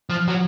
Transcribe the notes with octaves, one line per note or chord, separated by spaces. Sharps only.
F3
F#3